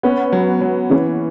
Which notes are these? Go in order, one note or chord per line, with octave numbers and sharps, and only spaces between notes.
B3 C#4
F#3
F#3
E3 C#4